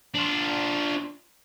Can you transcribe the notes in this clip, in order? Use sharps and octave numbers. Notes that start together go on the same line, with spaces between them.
D4 F4